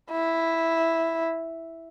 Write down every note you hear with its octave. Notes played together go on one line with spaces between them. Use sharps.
E4